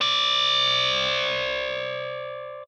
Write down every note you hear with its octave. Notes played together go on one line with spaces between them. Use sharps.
C5 D5